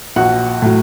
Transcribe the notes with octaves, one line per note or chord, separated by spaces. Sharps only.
A#1 F#4 F#5
A2 F#3